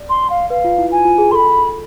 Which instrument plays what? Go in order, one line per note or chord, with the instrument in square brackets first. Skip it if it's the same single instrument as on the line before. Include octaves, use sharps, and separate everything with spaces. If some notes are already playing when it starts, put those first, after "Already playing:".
Already playing: [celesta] D5
[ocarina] C6
F5
[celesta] B4 [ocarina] F5
[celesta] F4
E4
[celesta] F4 [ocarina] G#5
[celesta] F4
G#4
[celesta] A4 [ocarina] B5 C6